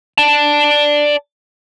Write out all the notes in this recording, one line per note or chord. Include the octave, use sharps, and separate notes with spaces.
D5 A5